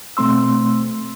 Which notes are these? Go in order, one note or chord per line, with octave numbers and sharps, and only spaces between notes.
B2 A3 C4 C6 E6